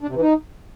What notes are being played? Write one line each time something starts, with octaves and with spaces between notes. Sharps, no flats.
D4
C3
E3
D#4